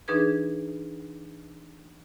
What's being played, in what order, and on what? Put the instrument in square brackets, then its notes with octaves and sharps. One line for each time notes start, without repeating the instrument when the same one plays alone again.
[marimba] E3 D4 D#4 G#4 B4 G#6